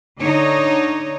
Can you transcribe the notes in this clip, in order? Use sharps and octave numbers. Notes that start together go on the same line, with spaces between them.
D3 D#4 C#5 D#5